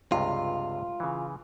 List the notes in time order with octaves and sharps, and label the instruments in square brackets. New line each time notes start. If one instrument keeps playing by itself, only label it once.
[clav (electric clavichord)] C#2 G2 C3 [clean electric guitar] F4
[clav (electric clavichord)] C#3 E3